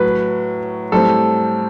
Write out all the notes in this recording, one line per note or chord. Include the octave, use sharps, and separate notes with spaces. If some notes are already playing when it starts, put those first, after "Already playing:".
Already playing: A2 F#3 B4
A2 G3 C4 A4